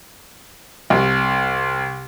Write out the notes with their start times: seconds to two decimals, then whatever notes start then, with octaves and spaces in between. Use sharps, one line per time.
0.90 C2